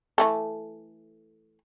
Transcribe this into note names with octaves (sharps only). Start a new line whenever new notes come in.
E3 A3 A4